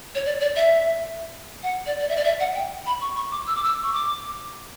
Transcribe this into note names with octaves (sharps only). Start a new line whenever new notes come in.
C#5
D5
D5
E5
F#5
D5
D5
E5
D5
E5
F#5
G5
B5
C#6
C#6
D6
E6
D6
E6
C#6
D6